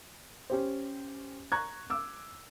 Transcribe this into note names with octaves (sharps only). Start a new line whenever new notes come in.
C#4 G4 C5
A#5 C#6 F#6 G#6
D6 E6